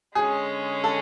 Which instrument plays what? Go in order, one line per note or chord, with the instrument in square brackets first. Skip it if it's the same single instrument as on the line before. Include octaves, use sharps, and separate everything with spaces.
[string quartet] D3 G#3 C#4 [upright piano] G#4
[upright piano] A4